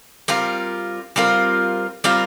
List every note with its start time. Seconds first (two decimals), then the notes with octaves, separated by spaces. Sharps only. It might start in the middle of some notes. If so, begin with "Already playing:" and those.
0.28 G3 C4 F4 A#4
1.16 G3 C4 F4 A#4
2.04 G3 C4 F4 A#4